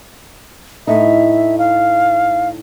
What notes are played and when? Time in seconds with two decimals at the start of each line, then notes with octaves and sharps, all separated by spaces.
0.87 A2 D#4 E5
1.58 F5